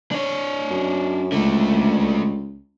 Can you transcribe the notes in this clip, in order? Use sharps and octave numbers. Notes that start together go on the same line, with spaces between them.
D4 C#5
F#2
C#2 D3 A3